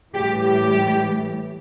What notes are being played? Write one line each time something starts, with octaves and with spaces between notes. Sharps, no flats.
A2 E3 G3 G4
G4